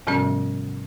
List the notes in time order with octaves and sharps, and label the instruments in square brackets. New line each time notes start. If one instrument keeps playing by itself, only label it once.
[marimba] G#2 C3 F3 G3 B3 C#4